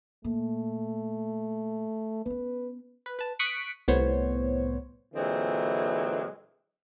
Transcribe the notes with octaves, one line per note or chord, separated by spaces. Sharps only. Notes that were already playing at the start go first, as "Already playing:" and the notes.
A#2 A3
B3 C#4 B4
B4
B4 A5
C#6 D#6 F#6 B6 C#7 D7
C2 A2 B3 C5 C#5
A#2 D3 E3 F#3 G#3 C4